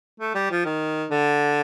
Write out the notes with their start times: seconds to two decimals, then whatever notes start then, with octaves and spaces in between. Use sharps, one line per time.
0.20 A3
0.35 G3
0.51 F3
0.65 D#3
1.10 D3